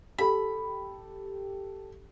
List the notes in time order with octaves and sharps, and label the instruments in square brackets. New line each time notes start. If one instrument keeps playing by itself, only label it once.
[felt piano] G4 A4 [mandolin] B5